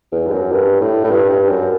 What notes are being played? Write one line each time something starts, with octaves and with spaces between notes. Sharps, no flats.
E2
G2
F#2
G2
A2
A2
G2
G2
F#2